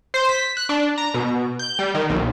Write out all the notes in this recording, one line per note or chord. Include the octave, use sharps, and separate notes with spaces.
C5
B6
F#6
D4
A#5
B2
G6
G3
D#3
B1